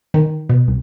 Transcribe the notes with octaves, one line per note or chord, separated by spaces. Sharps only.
D#3
B2
C2